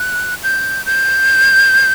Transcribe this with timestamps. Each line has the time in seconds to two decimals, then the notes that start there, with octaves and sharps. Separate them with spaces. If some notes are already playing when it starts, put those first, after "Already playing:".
Already playing: F#6
0.43 G6
0.86 G6